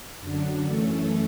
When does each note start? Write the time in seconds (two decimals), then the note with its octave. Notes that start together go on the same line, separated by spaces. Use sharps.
0.21 F#2 D3 F#3 D4
0.64 F#2 E3 A3 C#4 A4